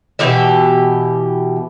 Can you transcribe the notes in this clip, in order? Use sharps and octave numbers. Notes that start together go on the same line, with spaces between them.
B2 E3 G4 E5